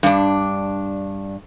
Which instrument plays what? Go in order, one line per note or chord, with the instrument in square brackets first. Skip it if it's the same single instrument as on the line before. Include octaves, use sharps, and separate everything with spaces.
[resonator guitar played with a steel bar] G2 D4